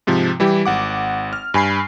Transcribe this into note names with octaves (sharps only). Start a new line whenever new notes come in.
G#2 C3 F3
E3 G3 E4 G4
G#1 F#5 D6
F6
G2 G#5 B5 C7